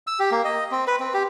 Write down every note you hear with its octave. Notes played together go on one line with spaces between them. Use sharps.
E6
G4
A#3
D#5
C4
B4
C4
G4